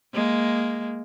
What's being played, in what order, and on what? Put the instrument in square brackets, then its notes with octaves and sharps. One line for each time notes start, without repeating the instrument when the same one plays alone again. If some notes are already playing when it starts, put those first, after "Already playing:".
[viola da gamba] G#3 A#3